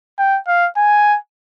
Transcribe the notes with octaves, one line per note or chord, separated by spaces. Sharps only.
G5
F5
G#5